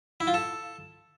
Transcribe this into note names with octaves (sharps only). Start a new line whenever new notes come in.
E4
F4
A4